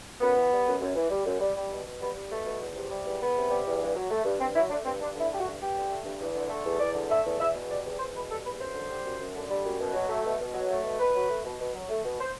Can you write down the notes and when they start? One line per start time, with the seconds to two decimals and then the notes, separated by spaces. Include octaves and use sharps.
0.20 F#2 B3
0.36 E3
0.51 G3
0.66 F#2
0.80 F#2
0.95 E3
1.10 G3
1.25 F#2
1.40 G3
1.56 G3
1.70 B2
1.85 B2
2.00 G3 B3
2.15 G3
2.30 B2 A3
2.46 B2
2.60 E2
2.75 C3
2.90 G3
3.05 E2
3.20 E2 B3
3.35 C3
3.49 G3
3.65 E2
3.80 G2
3.95 F#3
4.10 A3
4.25 G2
4.40 G2 C4
4.55 F#3 E4
4.69 A3 D4
4.85 G2 C4
5.00 G2 D4
5.15 D3
5.20 E4
5.30 A3 G4
5.40 F#4
5.45 G2
5.59 G2 G4
5.75 D3
5.90 A3
6.05 G2
6.20 E2
6.35 D3
6.50 A3
6.64 E2
6.80 E2 D5
6.95 D3
7.09 A3 E5
7.25 E2
7.40 E2 E5
7.55 B2
7.69 G3 D5
7.85 E2
7.99 E2 C5
8.14 B2 B4
8.29 G3 A4
8.44 E2 B4
8.59 F#2 C5
8.74 D3
8.90 G3
9.05 F#2
9.19 F#2
9.35 D3
9.49 G3
9.65 F#2
9.79 B2
9.94 F#3
10.09 A3
10.24 B2
10.39 B2
10.54 F#3
10.70 A3
10.84 B2
10.99 B2 B4
11.15 F#3
11.29 A3
11.44 B2
11.59 B2
11.74 F#3
11.89 A3
12.04 B2
12.19 C5